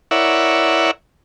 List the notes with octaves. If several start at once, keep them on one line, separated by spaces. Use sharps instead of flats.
E4 A#4 C#5 D5 E5 F#5